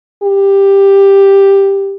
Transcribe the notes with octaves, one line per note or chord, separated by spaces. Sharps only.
G4